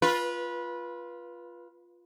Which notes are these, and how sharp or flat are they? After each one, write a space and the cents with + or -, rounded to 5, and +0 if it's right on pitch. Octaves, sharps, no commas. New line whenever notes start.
F4 +0 B4 -20